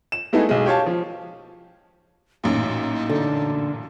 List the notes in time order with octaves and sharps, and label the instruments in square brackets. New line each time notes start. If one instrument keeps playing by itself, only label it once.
[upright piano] E7
G#3 A3 B3 D#4 E4 G#4
B1 G#3
G4 C#5 F5 A5
F3
[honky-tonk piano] A1 F#2 A#2 [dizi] D#4
[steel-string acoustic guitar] D3